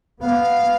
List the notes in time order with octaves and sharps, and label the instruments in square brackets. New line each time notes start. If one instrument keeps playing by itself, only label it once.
[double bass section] B3 [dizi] F5